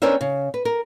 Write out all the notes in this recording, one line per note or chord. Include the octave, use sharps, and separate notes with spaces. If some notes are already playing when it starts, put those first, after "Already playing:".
B3 C#4 D4 A#4 C5 E5
C#3
B4
A#4